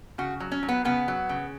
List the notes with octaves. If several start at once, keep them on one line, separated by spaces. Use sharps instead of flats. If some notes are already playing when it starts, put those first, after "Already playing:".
C#3 F#4
F#3
C#4
F#3
B3
C#3 B3
F#3
C#3